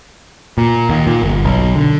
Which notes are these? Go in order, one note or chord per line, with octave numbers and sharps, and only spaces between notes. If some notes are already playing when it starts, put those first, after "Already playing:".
A#2
D#2
A#2
G1
B1
D3